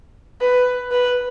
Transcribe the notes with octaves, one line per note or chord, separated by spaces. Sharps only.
B4
B4